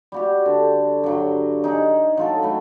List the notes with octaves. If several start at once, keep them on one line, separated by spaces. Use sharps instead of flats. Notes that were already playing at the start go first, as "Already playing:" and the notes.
G3 F#4 G4
D3
G2 F#3
D#4 G#4
F#3 F4 A4
F#3 A3 B5